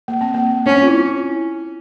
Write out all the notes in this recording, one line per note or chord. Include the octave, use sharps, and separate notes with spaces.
A#3
C4
A#3
C4 C#4
F4
E4